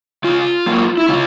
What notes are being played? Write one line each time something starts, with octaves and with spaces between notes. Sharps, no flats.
C#3 F4
F#3 A#3
E4
C#3 F4